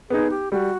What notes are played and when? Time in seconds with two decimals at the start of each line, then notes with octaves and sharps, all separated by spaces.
0.10 B3 D#4 G#4
0.30 G4
0.52 G3 F#4